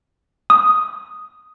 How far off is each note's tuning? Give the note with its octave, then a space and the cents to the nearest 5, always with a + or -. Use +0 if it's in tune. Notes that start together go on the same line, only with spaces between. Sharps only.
D#6 +0